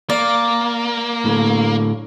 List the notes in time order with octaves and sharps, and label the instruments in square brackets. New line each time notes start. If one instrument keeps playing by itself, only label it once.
[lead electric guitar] A#3 [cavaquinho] D5
[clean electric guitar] A2 D3